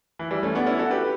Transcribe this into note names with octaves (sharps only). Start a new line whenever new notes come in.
E3
E3 G3
A3 C#4
B3 D4
C#4 E4
F#4 A4
G4 B4